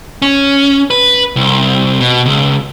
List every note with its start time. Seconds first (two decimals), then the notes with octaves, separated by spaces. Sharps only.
0.22 C#4
0.90 B4
1.36 C2
2.00 B2
2.25 C#2